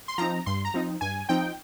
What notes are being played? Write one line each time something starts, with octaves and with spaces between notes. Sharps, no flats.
C6
F3 C4 D#4 A#5
G2 C6
A#5
F3 C4 D#4
G2 G#5
F3 C4 D#4 G5